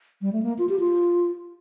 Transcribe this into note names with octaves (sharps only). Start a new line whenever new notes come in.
G3
A3
A#3
F4
G4
F4